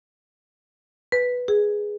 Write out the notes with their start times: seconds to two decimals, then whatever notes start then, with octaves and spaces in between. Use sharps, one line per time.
1.12 B4
1.48 G#4